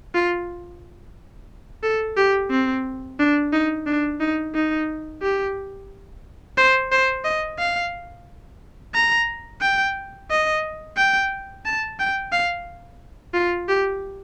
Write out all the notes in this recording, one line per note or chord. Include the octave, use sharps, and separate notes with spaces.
F4
A4
G4
C4
D4
D#4
D4
D#4
D#4
G4
C5
C5
D#5
F5
A#5
G5
D#5
G5
A5
G5
F5
F4
G4